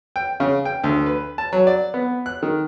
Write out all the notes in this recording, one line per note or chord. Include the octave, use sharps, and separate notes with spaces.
G5
C#3
G5
D2
B4
A5
F#3
D5
B3
F#6
D#3